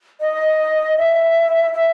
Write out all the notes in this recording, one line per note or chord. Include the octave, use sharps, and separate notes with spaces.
D#5
E5
E5